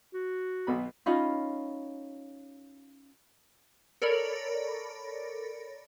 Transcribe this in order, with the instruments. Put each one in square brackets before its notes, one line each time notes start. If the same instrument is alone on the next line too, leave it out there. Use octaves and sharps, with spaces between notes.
[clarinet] F#4
[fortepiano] B1 B2 B5
[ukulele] C#4 D#4 F4 B5
[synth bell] A4 A#4 C#5 D5 B5